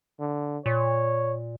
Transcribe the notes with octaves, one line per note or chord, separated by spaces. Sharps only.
D3
A#2 C#5